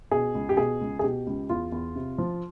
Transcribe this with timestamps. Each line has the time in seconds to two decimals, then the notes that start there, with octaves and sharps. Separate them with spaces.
0.11 B2 G#4
0.35 C#2
0.49 G4
0.57 B2 G#4
0.81 C#2
0.99 G#4
1.04 B2 G4
1.27 C#2
1.49 E2 F4
1.72 E2
1.96 C3
2.18 F3